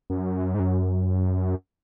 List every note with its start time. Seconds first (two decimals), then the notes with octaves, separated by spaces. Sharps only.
0.10 F#2
0.54 G#2
0.60 F#2